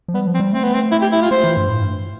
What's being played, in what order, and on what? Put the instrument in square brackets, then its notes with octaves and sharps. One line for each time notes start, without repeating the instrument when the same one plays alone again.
[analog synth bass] F3
[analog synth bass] G3 [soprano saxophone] B3
[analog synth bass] F3
[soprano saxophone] C4
[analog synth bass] G3
[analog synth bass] A3 [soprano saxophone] C4
[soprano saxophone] B3
C4
E4
G4
E4
F4
[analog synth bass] A3 [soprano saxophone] C5
[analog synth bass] E3
G2
A2
G2